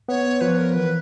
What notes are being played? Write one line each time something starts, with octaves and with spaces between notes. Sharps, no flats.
B3 C#5
F3 B4
A#4
E3 B4